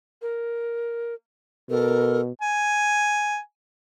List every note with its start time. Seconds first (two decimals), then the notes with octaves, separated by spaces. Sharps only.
0.22 A#4
1.70 B2 A4 A#4
2.41 G#5